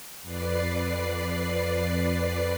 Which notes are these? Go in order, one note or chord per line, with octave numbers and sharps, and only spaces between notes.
F2 B4 D5 C7